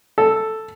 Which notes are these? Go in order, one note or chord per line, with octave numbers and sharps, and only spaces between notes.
A4